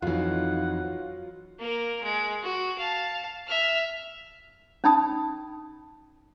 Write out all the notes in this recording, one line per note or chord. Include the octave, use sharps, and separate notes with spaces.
F2 E3 F#3 D#4 F4 F#5
A#3 A#4
G#3
F#4
F5 A5
E5 F6
C#4 D#4 A5 B5 D#6